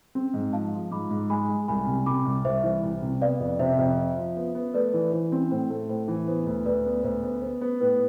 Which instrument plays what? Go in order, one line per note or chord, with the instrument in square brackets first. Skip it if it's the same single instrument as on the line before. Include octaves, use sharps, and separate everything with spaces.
[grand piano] C4
G#2
[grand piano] F3 [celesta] F5 A5
[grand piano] F3
[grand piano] G#2 [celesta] B5 D6
[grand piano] G#2
[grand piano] G#3 [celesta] G#5 B5
[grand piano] G#3
[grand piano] C2 [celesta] G#5 B5
[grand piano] C3
[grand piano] C3 [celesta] B5 D6
[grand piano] C2
[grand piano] C2 [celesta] C5 E5
[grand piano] E3
C2
C3
[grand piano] B3 [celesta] D5 F5
[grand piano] F2
[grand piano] C3 [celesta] C5 E5
[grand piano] F2
F3
F3
B3
B3
[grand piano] A3 [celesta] B4 D5
[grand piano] E3
[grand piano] E3 [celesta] C5
[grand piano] C4
[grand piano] A2 [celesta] C5
[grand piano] A3
[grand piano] A2 [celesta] C5
[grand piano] E3
[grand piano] B3 [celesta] C5
[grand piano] D2
[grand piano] D2 [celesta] B4 D5
[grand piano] B3
[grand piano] D2 [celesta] C5
[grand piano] B3
[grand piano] B3 [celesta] C5
[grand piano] B3
[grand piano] A2 [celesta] B4